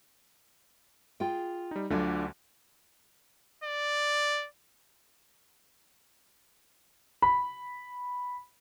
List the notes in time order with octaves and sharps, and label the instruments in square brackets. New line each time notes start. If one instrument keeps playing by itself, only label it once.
[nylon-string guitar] F4 G#4 G5
[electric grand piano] G3 D#4
[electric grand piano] D2 D3 [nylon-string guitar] F#3 D4 F4
[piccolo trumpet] D5
[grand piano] B5